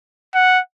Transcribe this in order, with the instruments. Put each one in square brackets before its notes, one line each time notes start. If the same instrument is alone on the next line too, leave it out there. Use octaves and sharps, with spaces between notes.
[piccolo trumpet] F#5